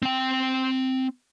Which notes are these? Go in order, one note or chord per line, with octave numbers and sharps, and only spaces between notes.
C4 G5